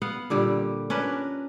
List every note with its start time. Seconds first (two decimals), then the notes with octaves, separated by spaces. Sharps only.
0.02 B3 F5 F#5
0.30 A#2 D3 G3 G4
0.90 C#4 D4 A#4 B4